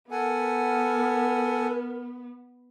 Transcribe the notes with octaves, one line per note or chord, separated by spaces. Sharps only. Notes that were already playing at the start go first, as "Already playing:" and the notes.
B3 A4 A#4 F#5 G#5